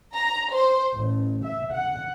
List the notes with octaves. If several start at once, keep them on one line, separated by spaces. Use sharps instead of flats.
A#5
C5
A1
E5
F#5